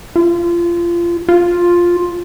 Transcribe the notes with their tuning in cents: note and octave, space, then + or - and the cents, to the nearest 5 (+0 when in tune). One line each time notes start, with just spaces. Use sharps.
F4 -25
F4 +5